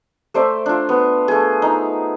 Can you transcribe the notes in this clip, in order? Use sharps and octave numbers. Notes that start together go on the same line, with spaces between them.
A3 C5 D5 E5
D4 F4
B3
A3 G#4
D#4